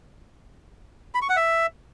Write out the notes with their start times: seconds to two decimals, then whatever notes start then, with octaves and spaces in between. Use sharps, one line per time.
1.15 B5
1.22 C#6
1.29 F#5
1.37 E5